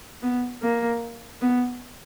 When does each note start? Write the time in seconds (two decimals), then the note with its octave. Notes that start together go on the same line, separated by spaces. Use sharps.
0.23 B3
0.62 A#3
1.41 B3